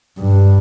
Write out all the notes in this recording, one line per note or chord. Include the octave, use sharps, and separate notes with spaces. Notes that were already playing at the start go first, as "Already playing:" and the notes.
G2